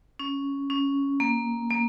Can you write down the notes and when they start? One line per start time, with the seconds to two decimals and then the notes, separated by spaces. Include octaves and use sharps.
0.19 C#4
0.70 C#4
1.20 A#3
1.70 A#3